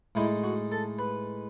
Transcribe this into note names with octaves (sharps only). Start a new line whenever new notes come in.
A2 G#3 D#4 E4
F#4
A4
B4